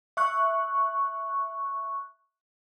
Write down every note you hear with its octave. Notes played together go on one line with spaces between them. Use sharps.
E5 C#6 F#6